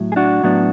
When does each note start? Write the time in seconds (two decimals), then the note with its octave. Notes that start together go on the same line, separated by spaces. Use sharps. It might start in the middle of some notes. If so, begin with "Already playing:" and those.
Already playing: A2 F#3
0.12 G#4
0.16 D4 F#4
0.43 A2 F#3 B3 D4